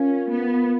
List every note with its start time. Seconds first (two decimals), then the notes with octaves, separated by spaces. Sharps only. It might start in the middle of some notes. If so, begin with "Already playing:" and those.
Already playing: C#4 F4 A#4 F5
0.31 B3